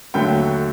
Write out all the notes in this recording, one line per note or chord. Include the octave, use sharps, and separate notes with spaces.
D#2 D3 F#3 A3 G5